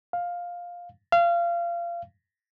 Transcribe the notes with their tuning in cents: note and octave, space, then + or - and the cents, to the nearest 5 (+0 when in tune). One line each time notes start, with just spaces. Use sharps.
F5 +10
F5 -25